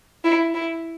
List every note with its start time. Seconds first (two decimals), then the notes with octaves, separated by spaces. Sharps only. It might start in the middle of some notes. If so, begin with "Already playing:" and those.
0.24 E4
0.55 E4